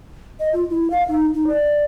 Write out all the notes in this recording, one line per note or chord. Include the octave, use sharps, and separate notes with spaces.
D#5
F4
E4
F5
D#4
D#4
D5